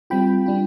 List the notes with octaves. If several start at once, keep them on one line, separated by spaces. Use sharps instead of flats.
G3 C4 F4 G5 B5
G3 D4 F4